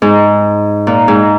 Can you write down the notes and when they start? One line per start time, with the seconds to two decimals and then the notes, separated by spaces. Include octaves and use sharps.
0.02 G#2
0.87 A#2
1.08 G#2